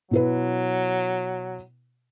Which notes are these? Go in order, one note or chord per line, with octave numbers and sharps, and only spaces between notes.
B2 F#3 E4 B4